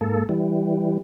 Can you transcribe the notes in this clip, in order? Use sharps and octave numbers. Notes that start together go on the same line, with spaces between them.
G#2 A#3 A4
E3 G3